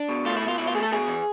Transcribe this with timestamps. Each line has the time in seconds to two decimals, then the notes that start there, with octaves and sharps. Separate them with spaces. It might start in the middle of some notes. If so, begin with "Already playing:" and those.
Already playing: D4
0.09 B2
0.25 A3 F4
0.37 E4
0.42 B2
0.48 F4
0.58 B2 E4
0.67 F4
0.75 A3 G#4
0.83 A4
0.92 B2 G#4
1.07 E2